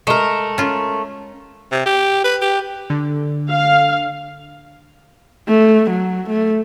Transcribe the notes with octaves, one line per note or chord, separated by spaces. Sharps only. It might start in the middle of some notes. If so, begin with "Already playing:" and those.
G#3 A3 A#4
C#4 F4
C3
G4
B4
G4
D3
F5
A3
F#3
A3